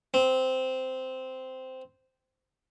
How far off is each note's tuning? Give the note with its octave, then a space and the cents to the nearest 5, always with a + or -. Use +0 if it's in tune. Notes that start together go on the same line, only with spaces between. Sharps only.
C4 -10